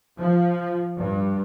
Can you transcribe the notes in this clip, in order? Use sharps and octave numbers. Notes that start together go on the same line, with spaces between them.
F3
G2